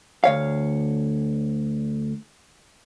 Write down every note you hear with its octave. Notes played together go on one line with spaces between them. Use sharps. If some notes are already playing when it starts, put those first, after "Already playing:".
D2 C#5 F5